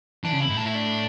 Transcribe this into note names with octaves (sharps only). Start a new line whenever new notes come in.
E3 D4
C#3
E4
G#2
A2 D4
E4
D4